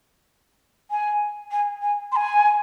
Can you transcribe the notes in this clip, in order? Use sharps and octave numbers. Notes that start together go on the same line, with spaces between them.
G#5
G#5
G#5
C6
G#5